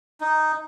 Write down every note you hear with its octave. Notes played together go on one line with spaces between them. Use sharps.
D#4